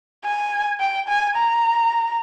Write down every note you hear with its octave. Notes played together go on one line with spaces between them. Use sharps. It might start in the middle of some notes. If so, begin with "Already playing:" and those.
G#5
G5
G#5
A#5